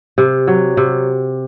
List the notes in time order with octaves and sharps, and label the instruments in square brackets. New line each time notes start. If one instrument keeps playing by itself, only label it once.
[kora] C3
F#3
C3